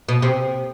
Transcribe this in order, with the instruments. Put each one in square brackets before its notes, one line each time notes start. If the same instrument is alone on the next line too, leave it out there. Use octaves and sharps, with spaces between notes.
[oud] B2
C3